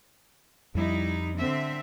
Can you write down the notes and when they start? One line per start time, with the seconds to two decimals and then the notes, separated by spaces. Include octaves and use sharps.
0.75 F2 F3 G3 D#4 E4
1.37 D3 C4 E5